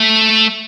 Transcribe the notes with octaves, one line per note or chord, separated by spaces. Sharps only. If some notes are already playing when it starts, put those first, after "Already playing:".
Already playing: A3